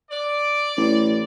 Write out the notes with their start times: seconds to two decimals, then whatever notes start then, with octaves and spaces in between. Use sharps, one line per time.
0.11 D5
0.77 A1